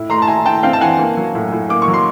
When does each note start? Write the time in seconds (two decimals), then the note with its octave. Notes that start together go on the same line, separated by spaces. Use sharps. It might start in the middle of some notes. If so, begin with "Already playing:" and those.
Already playing: A2 E4
0.09 A3 A#5 C6
0.22 A5
0.27 E4 G#5 A#5
0.45 E4 G5 A5
0.63 C4 F5 G5
0.73 A5
0.81 E3 F#5 G#5
0.99 A#3
1.17 F#3
1.35 A2
1.52 A2
1.69 A#3 D6
1.82 C#6
1.88 F#3
1.94 C6